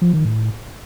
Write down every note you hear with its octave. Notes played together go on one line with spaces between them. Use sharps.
F3
D#3
A2